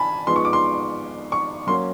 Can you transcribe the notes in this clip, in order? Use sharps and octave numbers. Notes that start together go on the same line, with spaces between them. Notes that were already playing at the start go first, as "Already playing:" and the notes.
Already playing: G#5 A5 B5
F3 G#3 B3 D#4 C6
C#6
D6
C6
C#6
F#3 A#3 C#4 C6